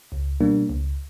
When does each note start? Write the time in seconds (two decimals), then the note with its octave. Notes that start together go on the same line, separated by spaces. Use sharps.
0.12 C#2
0.41 B2 G3 A#3 D4
0.69 C#2